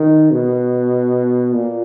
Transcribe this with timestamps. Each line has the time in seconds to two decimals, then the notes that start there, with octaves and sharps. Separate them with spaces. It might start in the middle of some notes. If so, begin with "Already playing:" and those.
Already playing: D#3
0.31 B2
1.53 A#2